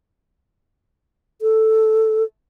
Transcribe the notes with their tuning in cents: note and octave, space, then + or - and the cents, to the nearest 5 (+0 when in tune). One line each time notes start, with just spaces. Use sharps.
A4 +0